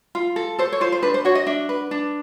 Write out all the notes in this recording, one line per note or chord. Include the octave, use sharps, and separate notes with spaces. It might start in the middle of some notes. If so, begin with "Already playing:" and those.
F4
A4
A4 C5
C#5
F4 C5
C5
D4 B4
C5
F#4 C#5
D#5
D4 E5
B4
D4